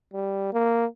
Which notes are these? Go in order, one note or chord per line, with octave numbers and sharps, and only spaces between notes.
G3
A#3